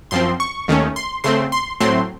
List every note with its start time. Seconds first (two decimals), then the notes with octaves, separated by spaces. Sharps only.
0.11 F#2 F3 C4 C6
0.40 C#6
0.68 D#2 D#3 A3 C#4
0.96 C6
1.24 C#3 A3 C4 C6
1.52 C6
1.80 A2 F#3 A3 C4 C6